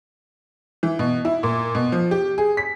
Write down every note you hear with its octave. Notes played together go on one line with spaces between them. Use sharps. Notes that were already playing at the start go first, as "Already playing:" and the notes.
E3
B2
E4
A#2
B2
F3
G4
G#4
B6